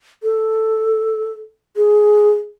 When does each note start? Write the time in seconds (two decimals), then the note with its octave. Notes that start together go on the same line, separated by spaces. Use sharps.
0.23 A4
1.77 G#4